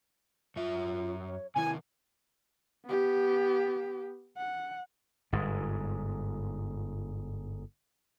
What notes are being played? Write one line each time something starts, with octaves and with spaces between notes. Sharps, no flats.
F#2 F4 E5
C#5
C3 D#3 E4 G#5
B3 G4
F#5
G1 G#2